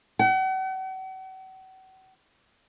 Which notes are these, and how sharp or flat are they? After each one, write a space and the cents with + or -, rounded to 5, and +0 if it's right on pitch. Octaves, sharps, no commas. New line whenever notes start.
F#5 +40